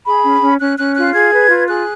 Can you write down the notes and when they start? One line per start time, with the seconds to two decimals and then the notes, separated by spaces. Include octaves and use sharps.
0.05 G#4 B5
0.23 C#4
0.41 C#4
0.59 C#4 F#6
0.78 C#4 F#6
0.96 F4 F#6
1.13 G#4 G#6
1.31 B4
1.49 F4
1.67 G#4 F#6